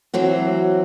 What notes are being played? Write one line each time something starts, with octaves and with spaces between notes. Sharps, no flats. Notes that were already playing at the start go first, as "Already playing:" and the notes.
E3 F#3 C4 F#4